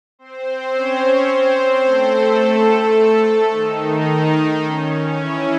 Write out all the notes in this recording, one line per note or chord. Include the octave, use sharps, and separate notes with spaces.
C4 C5
C#4 C#5
C4 C5
A3 A4
D#3 D#4
C#4
E3 E4